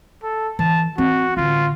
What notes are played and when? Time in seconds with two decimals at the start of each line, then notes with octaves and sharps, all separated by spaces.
0.24 A4
0.59 E3 A5
0.98 C4 F#4
1.37 A1 D3 F4